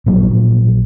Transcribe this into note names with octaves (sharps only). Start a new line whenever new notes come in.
A#1 A#2 F#3